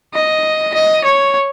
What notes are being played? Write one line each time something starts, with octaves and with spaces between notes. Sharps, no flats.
D#5
D#5
C#5